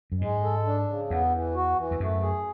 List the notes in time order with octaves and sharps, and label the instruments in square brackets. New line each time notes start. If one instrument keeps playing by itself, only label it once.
[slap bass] F#2
[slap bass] G#2 [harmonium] G#3
[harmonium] A4
D4
C#3
[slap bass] E2 [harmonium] B3
[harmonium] E3
F#4
E3
[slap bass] E2
[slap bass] F#2 [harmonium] A3
[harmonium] G#4